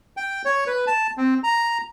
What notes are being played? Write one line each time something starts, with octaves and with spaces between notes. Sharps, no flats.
G5
C#5
B4
A5
C4
A#5